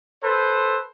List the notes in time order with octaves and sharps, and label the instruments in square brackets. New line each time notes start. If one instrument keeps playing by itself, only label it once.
[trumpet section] A4 B4 C5